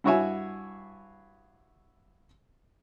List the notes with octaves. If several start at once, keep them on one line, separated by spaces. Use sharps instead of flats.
G2 E4 F#4 C#5 E5 G#5